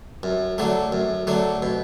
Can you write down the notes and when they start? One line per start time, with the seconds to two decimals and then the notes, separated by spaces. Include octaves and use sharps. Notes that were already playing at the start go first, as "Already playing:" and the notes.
0.23 F#2
0.58 D3 F#3 A3
0.92 F#2
1.27 D3 F#3 A3
1.62 B2